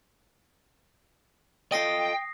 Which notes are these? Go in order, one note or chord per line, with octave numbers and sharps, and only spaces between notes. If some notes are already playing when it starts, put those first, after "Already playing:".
F4 A4 D#5 G5 D#6 A#6 C7